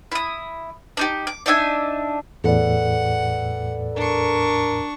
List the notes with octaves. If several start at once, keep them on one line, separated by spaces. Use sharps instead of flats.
E4 D#6
D4 D#4 G4
D6
D4 D#4 E5 G#5
E2 A2 A4 B4 D5 F#5
D4 A#4 C#6